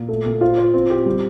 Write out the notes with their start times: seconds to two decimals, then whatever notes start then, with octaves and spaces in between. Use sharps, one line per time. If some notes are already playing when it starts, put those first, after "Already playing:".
Already playing: A#2
0.09 A3
0.26 A#2
0.41 F4 C5
0.58 C5
0.74 C4
0.90 G4
1.06 G3